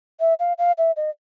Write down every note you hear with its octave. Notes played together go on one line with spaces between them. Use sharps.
E5
F5
F5
E5
D#5